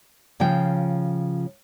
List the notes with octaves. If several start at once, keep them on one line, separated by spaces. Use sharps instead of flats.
C#3 F3 F4 G5